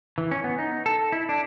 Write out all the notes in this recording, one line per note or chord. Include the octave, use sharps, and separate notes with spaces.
E3
C#4
B3
D#4
A4
E4
D4